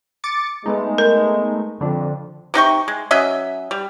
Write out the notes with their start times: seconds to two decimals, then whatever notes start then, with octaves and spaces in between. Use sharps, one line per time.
0.24 D6 A6 C#7
0.66 G#3 A3 B3 D#4
0.98 A#4
1.81 F2 D3 D4
2.54 C3 D#4 G5 C#6
2.88 G#3
3.11 F#3 C#4 D#5 E5
3.71 G3